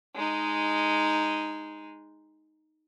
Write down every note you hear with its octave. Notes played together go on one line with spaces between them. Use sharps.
G#3 D#4